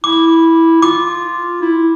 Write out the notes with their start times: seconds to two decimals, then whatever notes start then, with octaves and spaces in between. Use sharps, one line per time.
0.04 E4 D6
0.82 F4 D6
1.62 E4